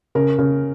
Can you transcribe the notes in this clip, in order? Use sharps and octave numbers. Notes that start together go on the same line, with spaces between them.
C#3 A#4
C#3